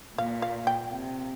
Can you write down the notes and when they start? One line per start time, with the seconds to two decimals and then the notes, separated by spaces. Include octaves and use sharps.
0.18 A#2 F5
0.42 F5
0.67 G5
0.92 C3